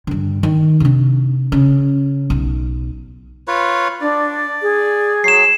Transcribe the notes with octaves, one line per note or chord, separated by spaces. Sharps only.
G2 D3
D#3
C3 D4
C#3
B1
F4 B4 C#5
D4 D5
G#4
F#3 C7 E7